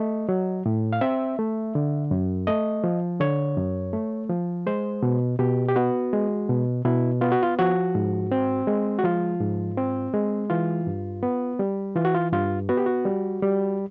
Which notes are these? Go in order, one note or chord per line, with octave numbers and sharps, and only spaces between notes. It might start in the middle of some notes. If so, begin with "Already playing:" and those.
Already playing: A3 D#5
F#3
A2
F5
C4 E5
A3
D3
F#2
A3 D#5
F3
D3 C#5
F#2
A3
F3
G#3 C5
B2
B2 G4
G4
B3 F#4
G#3
B2
B2 E4
B3 F4
F#4
F4
F3 F#4
G#2
C4
G#3
F#4
F3 F4
G#2
C4
G#3
E3 F4
G2
B3
G3
E3 F4
F#4
F4
G2 F4
B3 F#4
G4
F#4
G3
G3